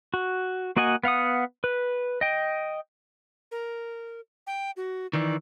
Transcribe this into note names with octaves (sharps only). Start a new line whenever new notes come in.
F#4
A#3 F#4 D#5 F#5 G#5
B3 F5 F#5 D#6
B4
D#5 G5
A#4
G5
F#4
D#3 E3 D5